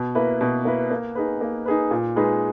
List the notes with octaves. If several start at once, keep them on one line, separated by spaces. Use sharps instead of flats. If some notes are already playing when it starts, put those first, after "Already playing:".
Already playing: B2
A#3 E4 B4
B2
A#3 E4 B4
A#3
D#4 G#4 B4
A#3
D#4 G#4 B4
A#2
G#3 D#4 G#4 B4